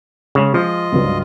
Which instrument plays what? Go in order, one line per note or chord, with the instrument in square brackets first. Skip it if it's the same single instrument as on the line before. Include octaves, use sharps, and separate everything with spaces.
[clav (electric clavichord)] C#3 [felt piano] G#3
[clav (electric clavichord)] F3 [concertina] F4 D#5
[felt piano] C#2 G2 F#3